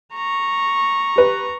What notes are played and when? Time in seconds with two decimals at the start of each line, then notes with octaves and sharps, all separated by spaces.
0.15 A#5 C#6
1.16 G4 B4